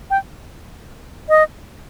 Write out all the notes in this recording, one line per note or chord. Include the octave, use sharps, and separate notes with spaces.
G5
D#5